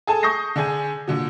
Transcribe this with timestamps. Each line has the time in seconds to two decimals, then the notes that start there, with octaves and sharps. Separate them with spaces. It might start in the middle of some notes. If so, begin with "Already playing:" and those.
0.07 G#4 A4 G#5 A5
0.23 C#6 D#6 G6 A#6 C7
0.56 D3 D4 G#4 G#5
1.08 A#2 D3 F#3